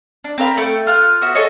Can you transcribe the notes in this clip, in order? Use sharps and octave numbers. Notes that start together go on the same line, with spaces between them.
D4
C4 A#4 F5 B5
A3 G5
F4 F6 F#6
B3 F#4 E5
G#4 A4 C#5 D#5